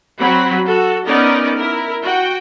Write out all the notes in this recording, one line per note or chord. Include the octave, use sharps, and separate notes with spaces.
F#3 C4 F#4 B5
F#4 A4
B3 C#4 D#4 A#4 D5
E4 A#4
F#4 G5